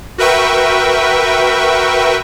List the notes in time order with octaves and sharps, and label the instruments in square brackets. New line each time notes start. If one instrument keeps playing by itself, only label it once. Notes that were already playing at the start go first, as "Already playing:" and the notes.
[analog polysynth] F#4 A#4 B4 E5 G5 C#6